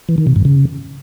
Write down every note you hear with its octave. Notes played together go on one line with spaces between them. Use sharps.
E3
D#3
C3
G2
C#3